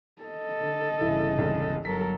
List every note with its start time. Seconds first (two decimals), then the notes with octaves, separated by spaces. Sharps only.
0.22 A4 D#5
0.59 D3
1.01 G1 C#3 E3 E4
1.38 E1 C2
1.85 G1 F#3 A4 A#4 B6